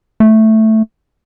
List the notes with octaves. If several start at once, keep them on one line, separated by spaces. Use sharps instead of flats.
A3